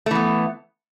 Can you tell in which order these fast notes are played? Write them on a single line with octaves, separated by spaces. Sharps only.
A3 E3 B3